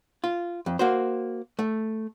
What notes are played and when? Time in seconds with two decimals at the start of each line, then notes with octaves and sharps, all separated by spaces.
0.24 F4
0.66 F2
0.79 A#3 F#4 C5
1.59 A3